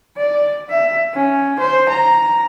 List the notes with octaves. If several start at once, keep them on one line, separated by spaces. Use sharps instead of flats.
D5
E5
C#4
C5
A#5